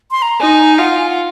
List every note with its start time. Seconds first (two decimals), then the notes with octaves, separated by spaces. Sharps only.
0.11 C6
0.22 A#5
0.40 D#4 G#5
0.78 F4 F#5
0.98 G#5
1.09 F#5